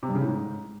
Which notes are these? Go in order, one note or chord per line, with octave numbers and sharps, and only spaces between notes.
C3
G2
C#3
A2
G#2